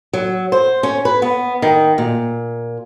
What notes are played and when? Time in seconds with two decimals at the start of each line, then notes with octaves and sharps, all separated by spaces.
0.13 F#3
0.52 C5
0.83 C#4
1.05 B4
1.22 B3
1.62 D#3
1.98 A#2